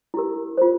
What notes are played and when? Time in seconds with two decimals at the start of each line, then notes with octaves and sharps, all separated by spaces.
0.14 E4 G4 A#4
0.57 F4 C5